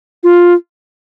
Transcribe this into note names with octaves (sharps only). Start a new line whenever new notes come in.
F4